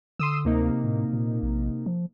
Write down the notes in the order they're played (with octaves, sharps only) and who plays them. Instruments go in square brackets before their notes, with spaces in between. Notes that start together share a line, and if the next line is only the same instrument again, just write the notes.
[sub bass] D3 [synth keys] C6 D#6 E6
[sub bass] D2 [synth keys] C3 A#3 D#4
[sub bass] A2
A#2
A#1
F3